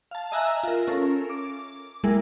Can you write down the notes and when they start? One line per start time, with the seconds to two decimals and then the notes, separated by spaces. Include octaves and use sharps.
0.11 F5 A5
0.32 D#5 E5 G#5 A#5 E6 F#6
0.63 F4 A#4
0.87 C#4 A4 A#4
1.30 D6
2.04 G3 G#3 A#3 E4 G#4 A#4